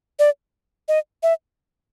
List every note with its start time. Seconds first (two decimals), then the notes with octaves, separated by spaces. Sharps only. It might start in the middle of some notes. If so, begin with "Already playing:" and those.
0.19 D5
0.88 D#5
1.23 E5